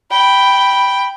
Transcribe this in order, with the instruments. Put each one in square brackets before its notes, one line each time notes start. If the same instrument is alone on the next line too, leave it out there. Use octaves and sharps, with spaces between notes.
[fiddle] G5 [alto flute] B5